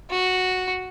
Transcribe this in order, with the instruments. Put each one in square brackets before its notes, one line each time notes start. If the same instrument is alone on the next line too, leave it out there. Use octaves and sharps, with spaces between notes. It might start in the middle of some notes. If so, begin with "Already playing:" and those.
[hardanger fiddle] F#4